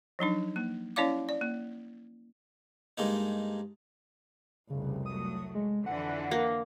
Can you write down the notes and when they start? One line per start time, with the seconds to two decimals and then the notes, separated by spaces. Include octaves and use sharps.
0.19 F3 F#3 D4 D#4
0.56 A#3
0.96 C#4 E4 C#5 D5 F5 D6
1.29 D5
1.41 A#3
2.98 G2 G#3 A#3 D#4
4.70 F1 C2 C#3
5.06 F#3 A3 D#6
5.55 G#3
5.86 F2 D3 E3 F#5
6.31 A#3